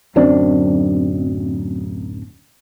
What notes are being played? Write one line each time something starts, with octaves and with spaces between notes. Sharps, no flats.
D1 F#2 C4 D4